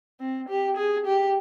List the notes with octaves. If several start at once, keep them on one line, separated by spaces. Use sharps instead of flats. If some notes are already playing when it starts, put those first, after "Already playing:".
C4
G4
G#4
G4